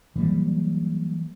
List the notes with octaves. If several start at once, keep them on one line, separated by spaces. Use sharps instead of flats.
E3 F#3 G3 A#3